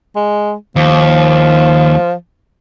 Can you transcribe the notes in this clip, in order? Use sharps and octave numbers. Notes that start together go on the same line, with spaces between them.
G#3
D#2 F3